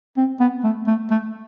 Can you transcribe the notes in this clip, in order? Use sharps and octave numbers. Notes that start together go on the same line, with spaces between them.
C4
B3
A3
A3
A3